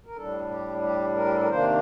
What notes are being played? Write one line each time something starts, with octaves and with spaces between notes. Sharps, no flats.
A#4
A2 G3 D4 A4
G4
G4
A#4
G4
A4
A#4
C3 D#3 A#3 D4 C5